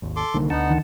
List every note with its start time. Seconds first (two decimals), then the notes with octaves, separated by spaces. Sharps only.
0.02 G#1 D#2
0.16 A4 C6 D6
0.34 C2 D3 D#3 A#3
0.50 D2 D3 B3 D#4 F#5 A5
0.70 D#3